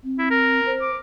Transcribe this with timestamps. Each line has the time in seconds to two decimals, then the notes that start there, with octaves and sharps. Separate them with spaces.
0.04 C4
0.19 E4
0.31 A#4
0.66 C5
0.81 D6